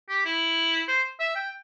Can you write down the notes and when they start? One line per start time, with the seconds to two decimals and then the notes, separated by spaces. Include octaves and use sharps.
0.09 G4
0.25 E4
0.88 C5
1.20 E5
1.36 G5